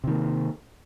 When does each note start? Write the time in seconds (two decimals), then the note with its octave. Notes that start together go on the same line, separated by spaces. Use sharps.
0.04 C3
0.07 D#3
0.11 A#3